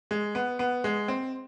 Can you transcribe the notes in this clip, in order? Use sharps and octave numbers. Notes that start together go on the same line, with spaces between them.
G#3
B3
B3
G#3
C4